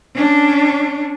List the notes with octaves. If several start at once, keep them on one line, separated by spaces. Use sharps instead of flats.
C#4 D4